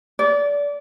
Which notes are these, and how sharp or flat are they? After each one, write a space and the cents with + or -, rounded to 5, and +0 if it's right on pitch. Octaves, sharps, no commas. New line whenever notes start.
D5 -25